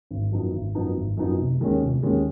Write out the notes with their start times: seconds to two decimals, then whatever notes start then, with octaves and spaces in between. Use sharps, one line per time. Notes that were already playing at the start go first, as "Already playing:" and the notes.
0.11 G#1
0.32 F#2 F3 B3 D#4
0.53 G#1
0.75 F#2 F3 B3 D#4
0.96 G#1
1.17 F#2 F3 B3 D#4
1.39 F1
1.60 D#2 D#3 G#3 C#4
1.82 F1
2.03 D#2 D#3 G#3 C#4